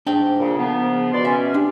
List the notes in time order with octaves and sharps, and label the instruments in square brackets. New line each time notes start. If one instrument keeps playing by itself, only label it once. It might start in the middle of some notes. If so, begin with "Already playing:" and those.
[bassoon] G#2 [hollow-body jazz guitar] D4 G5
[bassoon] A#2 [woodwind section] C#3
[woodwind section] C#3 F3 B3 [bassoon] A#4
[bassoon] B2 [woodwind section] D5 C6
[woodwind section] C#4 [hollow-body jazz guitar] E5
[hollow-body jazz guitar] D4 [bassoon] G4